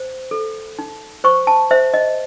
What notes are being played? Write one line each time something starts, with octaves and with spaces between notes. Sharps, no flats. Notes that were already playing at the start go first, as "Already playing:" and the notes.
Already playing: C5
A4
D#4
C5 C#6
A5
C5 E5
D#5